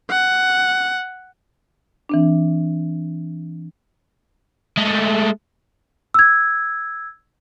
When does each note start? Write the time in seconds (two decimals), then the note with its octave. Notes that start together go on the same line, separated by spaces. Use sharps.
0.11 F#5
2.09 E3 C4 D4
4.77 G#3 A3
6.14 E6 G#6